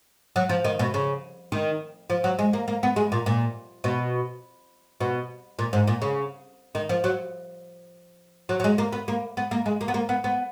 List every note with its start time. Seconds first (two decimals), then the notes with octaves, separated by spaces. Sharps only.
0.36 F#3
0.49 F3
0.64 D#3
0.79 B2
0.94 C#3
1.52 D#3
2.10 F3
2.24 F#3
2.39 G#3
2.53 A#3
2.68 A#3
2.83 B3
2.96 G#3
3.12 A#2
3.26 A#2
3.84 B2
5.00 B2
5.59 A#2
5.73 G#2
5.87 A#2
6.02 C#3
6.75 D#3
6.89 F3
7.04 F#3
8.49 F#3
8.60 F#3
8.64 G#3
8.78 A#3
8.92 B3
9.08 A#3
9.37 B3
9.51 A#3
9.66 G#3
9.81 A#3
9.88 B3
9.94 A#3
10.09 B3
10.24 B3